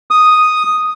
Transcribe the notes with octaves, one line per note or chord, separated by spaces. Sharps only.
D#6